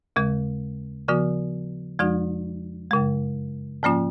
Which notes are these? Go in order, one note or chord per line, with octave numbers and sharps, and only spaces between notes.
D#2 C#3 G#3
C#3 F3 B3 F#4
F2 F3 G#3 D#4 F#4
F#2 C#3 G#3
G#2 F3 A#3 C#4 F4